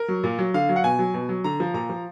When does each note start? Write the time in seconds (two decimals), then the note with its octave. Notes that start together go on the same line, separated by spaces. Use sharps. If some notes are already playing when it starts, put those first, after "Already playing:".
Already playing: A#4
0.08 F#3
0.24 A#2
0.39 F#3
0.54 D3 F5
0.69 F#3
0.76 F#5
0.84 B2 G#5
0.99 F#3
1.14 B2
1.29 F#3
1.44 D3 A#5
1.60 F3
1.74 A#2 A#5
1.90 F3